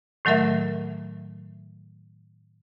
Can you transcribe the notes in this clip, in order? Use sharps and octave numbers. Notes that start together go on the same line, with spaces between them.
A2 D#3 F#3 A3 A#4 E5